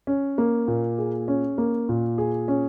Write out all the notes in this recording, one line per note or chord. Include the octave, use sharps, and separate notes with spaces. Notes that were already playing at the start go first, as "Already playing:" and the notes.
C#4
A#3
A#2
G#4
C#4
A#3
A#2
G#4
C#4